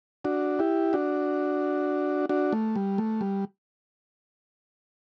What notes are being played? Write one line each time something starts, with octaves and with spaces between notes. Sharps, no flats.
D4 F#4
E4 G4
D4 F#4
D4 F#4
A3
G3
A3
G3